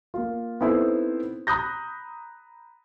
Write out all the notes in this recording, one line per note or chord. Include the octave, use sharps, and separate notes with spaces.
A#3 F4
B3 C4 D#4 E4 A4 C5
A#5 B5 D#6 F#6 G6 A#6